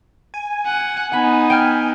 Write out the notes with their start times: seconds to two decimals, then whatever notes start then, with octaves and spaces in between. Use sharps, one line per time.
0.34 G#5
0.66 F#5
1.12 B3 D#4 F#5 B5
1.50 G5 F6 G#6